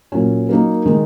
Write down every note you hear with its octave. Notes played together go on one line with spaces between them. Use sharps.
A#2 F#3 C#4
F#3 A#3 D#4 A#4
D#3 G#3 D#4